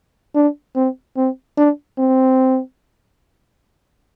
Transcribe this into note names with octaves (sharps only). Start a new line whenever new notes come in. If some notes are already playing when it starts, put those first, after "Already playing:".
D4
C4
C4
D4
C4